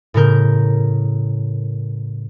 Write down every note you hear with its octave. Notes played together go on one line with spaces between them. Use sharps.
A2 C#3 A#4 G6